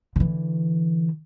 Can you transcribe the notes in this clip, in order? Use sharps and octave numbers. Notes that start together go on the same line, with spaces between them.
D3 E3